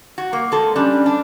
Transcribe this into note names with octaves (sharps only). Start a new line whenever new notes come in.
F#4
A#3
G#3 A4
G3 C#4 D4
D4